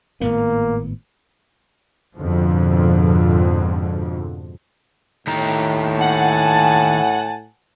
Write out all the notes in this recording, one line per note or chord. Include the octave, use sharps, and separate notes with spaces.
G#1 A2 A#3 B3
F2 G#2 B2 D3 F3
A2 D#3 G4 A#5
F#5 G#5 A5